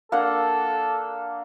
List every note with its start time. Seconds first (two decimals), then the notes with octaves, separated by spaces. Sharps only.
0.12 A#3 D4 A4 F#5